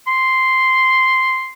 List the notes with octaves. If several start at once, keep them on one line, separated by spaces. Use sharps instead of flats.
C6